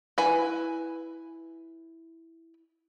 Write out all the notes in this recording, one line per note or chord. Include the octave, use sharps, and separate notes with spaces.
E4 B4 G#5